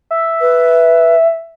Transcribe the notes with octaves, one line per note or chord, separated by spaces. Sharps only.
E5
B4